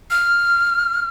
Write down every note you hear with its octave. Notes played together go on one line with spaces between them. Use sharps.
F6